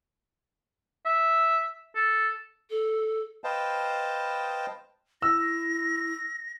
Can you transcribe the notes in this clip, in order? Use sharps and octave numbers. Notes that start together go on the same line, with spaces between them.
E5
A4
A4
B4 C5 D#5 F5 G5 A5
E4 E6 A#6